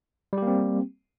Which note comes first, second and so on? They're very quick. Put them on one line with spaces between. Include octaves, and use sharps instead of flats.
G3 G4 A#3 C4